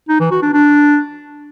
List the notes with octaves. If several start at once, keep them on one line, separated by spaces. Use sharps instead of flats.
D#4
E3
F#4
D4
D4